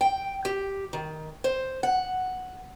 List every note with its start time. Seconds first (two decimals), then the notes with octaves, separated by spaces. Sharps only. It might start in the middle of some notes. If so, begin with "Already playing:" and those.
0.01 G5
0.45 G4
0.93 D#3
1.44 C5
1.83 F#5